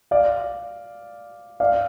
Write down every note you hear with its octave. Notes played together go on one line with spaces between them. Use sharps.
D5 F5
D5 F5